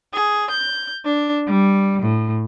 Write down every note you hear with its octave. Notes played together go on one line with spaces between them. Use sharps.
G#4
G6
D4
G3
A2